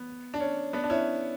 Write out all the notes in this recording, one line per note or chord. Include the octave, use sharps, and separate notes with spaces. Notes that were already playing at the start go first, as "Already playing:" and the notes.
Already playing: B3
D4
C#4
B3 D4
D4
C#4 E4